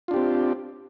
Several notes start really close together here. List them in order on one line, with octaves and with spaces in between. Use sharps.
F4 D4 G4 C4